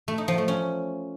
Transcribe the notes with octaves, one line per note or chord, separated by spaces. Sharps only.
A3
D#4
F3
A3
C#4